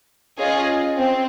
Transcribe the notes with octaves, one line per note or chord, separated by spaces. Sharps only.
C#4 F4 G#4 D#5
C4